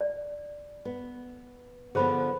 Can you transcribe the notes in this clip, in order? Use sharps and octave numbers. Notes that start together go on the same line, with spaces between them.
D5
B3
D3 F3 B3 G#4 C5 B5